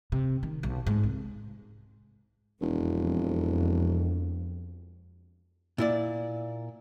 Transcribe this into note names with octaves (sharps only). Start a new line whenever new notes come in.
C3
D#3
B1
G#2
C2
E1 F2
A#2 E4 D5